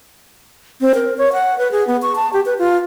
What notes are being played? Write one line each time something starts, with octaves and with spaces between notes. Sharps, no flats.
C4
A#4
C#5
F#5
B4
G#4
B3
C#6
A5
G4
B4
F4